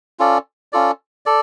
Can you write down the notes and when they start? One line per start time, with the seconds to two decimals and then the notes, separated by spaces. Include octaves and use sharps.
0.19 C#4 F4 A4 D5
0.73 C#4 F4 A4 D5
1.26 A4 D5